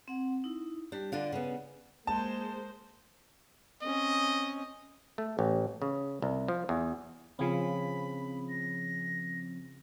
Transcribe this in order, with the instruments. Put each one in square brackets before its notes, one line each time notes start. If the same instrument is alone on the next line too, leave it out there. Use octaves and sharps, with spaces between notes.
[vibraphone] C4 F#5
D#4 E4
[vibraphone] G3 G4 [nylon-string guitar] D4
[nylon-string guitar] D3 D4 F4 [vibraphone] D5 F#5
[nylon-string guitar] C#3 B3 [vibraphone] F#5
[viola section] G#3 A#3 C5 [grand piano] A5
[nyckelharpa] C4 C#4 [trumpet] D#5
[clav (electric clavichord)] A3
A1
C#3
C2
F3
E2
[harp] C#3 F4 G#4 [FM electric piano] F3 C4 [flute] B5
[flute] A#6